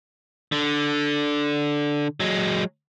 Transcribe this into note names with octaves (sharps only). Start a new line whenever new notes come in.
D3
F#3 G#3